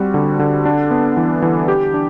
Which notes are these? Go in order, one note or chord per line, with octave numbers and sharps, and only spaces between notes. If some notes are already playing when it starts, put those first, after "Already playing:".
Already playing: G3 C4 F#4
D3
D3
D4
B3
E3
E3
G4
D4